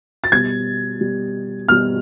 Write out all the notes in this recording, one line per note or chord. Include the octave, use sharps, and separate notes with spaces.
A6
B2 G3 G#6
B2 G3
B2 G3 F6